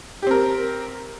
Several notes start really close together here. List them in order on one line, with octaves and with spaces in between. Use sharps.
G4 C4 A#4